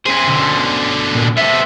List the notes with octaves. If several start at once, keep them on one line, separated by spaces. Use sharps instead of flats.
C#4 E4 G#4 C5
B2 D3
A#2
B3 A4 C5 E5